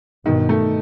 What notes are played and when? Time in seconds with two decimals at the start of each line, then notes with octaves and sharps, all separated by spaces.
0.25 G2 B2 D#3
0.49 A3